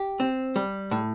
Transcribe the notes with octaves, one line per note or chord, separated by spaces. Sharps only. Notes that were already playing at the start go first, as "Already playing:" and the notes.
Already playing: G4
C4
G3
A2